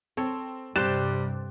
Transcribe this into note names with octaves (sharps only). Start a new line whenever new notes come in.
C4 A4 C#5
G2 C3 G3 G4 C5 F#6 A6 E7